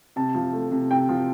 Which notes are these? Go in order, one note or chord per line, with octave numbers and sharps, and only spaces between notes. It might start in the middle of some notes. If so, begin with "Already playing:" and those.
C3 A5
F3
A3
C3
C3 G5
F3